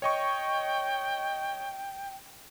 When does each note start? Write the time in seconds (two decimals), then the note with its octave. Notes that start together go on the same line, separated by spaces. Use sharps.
0.02 C#5 D#5 G5 C#6